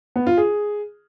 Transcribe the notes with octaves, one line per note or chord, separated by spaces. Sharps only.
B3
F4
G#4